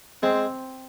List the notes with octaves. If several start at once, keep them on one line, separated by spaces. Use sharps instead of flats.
G#3 C4